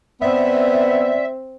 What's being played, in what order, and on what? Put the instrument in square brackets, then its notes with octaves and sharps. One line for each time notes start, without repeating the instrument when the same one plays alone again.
[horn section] B3 [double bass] C4 [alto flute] D5 [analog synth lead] E5